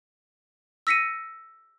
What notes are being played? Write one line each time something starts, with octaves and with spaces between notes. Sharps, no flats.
E6 A#6 B6 C#7 D#7